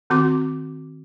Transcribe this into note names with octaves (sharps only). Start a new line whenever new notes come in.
D#3 C4 F#4 D6